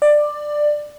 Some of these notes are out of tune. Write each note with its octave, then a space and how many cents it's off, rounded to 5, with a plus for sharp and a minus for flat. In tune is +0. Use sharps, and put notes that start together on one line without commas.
D5 +15